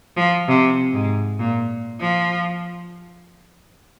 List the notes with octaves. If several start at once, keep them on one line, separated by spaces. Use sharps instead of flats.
F3
C3
G#2
A#2
F3